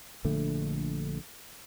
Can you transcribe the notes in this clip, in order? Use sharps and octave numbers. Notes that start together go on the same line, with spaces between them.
A#1 D3 A3